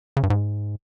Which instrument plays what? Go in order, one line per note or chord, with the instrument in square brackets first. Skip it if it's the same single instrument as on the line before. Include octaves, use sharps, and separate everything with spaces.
[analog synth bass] C#3
G2
G#2